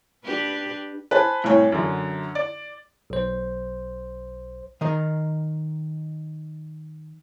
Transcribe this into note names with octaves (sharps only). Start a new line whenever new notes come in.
D4 G4 B4
B4 C5 G#5 A5
C2 A2 C#5 G#5
F#2 D3
D5
B1 C5
D#3 A#4 D#5